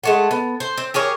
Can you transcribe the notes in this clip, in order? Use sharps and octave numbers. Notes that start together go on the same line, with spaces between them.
G#3 A3 F#5
B3
C5
C4
G4 G#4 A#4 C#5